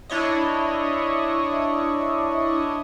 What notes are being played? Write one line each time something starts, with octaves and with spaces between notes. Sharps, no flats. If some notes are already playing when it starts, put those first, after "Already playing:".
D4 E4 C#5 D#5